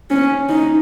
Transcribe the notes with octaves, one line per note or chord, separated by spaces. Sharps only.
C#4
D#4